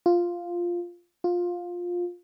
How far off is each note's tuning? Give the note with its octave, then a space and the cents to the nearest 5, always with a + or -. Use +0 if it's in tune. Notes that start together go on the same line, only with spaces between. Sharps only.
F4 +0
F4 +15